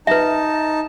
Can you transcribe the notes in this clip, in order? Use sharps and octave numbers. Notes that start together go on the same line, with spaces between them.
D#4 B4 E5 A5